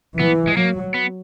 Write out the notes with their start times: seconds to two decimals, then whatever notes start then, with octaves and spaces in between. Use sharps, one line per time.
0.19 E3 B3
0.47 G#3
0.56 F#3 A#3
0.94 B3